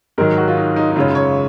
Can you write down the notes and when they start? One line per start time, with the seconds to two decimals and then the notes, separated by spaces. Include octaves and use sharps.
0.18 G#2 D#3 F#3 A#4
0.38 F#4
0.48 F4
0.57 D#4
0.76 D#4
0.91 D#4
0.96 F#2 C#3 G#3 C#4 F4
1.15 C#5